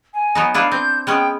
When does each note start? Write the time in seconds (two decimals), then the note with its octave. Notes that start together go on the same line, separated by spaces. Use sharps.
0.14 G#5
0.35 F#3 B3 D#4
0.54 D4 E4 B4 F5
0.72 C4 G6
1.07 G#3 B3 C#4 G5